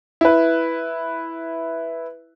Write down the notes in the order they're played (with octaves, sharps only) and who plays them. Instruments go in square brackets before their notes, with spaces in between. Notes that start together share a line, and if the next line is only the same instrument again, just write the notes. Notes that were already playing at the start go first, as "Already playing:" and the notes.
[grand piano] E4 B4